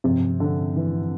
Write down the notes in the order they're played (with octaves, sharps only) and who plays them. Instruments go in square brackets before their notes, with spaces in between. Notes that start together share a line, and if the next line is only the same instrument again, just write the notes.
[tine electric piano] G2 F3 C4 [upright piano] C3
[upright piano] D3
E3